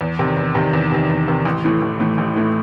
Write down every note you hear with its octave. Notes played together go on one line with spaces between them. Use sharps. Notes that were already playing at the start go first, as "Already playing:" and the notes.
E2
C3 D#3
E2
C3 D#3
E2
C3 D#3
E2
C3 D#3
A1
A2 E3 A3
A1
A2 E3 A3
A1
A2 E3 A3